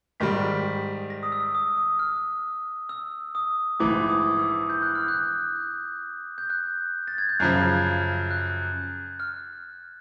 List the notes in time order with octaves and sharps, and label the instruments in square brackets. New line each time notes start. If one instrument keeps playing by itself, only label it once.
[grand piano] G#2 D#3 G3 [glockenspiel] B6
[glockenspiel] A#6
D#6
E6
D#6
D#6
F6
E6
D#6
[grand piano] A#1 G#2 E3 A3 [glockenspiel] D6
[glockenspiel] D#6
E6
G6
F#6
F6
F#6
G6
F#6
A6
G#6
G6
[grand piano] F#2 C#3 F3 [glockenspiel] F#6
[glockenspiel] F#6
F6